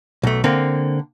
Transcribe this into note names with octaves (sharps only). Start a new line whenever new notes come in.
B1 A3
D3 A#3 C4